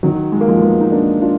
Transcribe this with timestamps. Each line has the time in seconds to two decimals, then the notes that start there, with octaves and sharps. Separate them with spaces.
0.03 D#3 F#3
0.32 G#3
0.41 A#3
0.48 F3 G#3
0.62 G#3 B3
0.81 D#4
0.92 A#3 D4
1.21 D4 F4